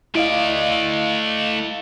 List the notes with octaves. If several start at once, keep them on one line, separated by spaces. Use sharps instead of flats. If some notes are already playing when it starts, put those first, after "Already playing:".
A3 E4 D5 D#5 F5